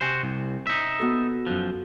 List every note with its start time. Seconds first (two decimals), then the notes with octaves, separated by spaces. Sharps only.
0.01 C3 F#4 C5 G#5
0.23 C2
0.67 D#4 E5
0.99 B3 F#4 A4
1.47 F#2 F3 F#6